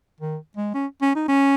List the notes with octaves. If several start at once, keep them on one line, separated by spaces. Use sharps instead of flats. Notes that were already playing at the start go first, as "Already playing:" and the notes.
D#3
G#3
C#4
C#4
D#4
C#4